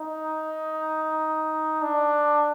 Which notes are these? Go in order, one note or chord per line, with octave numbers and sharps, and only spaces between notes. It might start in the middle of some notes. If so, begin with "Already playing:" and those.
Already playing: D#4
D4